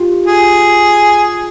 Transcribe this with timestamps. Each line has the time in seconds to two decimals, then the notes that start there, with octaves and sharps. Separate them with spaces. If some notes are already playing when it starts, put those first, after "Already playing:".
Already playing: F4 G4
0.26 G#4